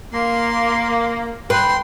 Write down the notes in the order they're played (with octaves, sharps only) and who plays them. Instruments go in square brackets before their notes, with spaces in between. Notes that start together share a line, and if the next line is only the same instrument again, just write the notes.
[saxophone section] A#3 [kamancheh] C6
[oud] B4 [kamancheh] G5 C6